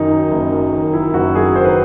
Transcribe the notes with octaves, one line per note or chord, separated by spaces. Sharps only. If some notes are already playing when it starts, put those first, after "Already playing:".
Already playing: F#2 D#3 D#4
F#3
F#1
F#2
D#3
F#3 E4
F#1 F#4
F#2 G#4
D#3 C5
B4